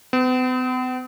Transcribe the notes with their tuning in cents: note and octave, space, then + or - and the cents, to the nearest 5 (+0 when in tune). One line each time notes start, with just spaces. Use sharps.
B3 +45